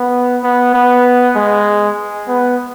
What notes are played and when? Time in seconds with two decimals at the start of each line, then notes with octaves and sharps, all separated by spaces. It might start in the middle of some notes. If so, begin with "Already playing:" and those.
Already playing: B3
0.43 B3
0.74 B3
1.36 G#3
2.28 B3